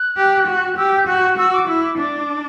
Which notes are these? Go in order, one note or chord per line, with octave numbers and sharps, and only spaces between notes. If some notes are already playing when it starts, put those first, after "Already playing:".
Already playing: F#6
G4
F#4
G4 E6
G6
F#4 F#6
F#4 E6
D6
E4 E6
D6
D4 D6
D6